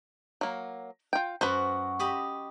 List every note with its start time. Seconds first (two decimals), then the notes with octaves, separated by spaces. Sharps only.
0.41 F#3 A#3
1.13 F4 G5
1.41 F#2 F#4 B4 C5
1.99 G4 D#5 B5